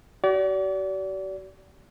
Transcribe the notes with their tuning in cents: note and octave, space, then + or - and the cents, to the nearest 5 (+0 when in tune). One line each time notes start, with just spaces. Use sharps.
F#4 +45 D5 -35